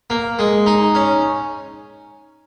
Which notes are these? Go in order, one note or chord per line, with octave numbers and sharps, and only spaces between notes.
A#3
G#3
D#4
C#4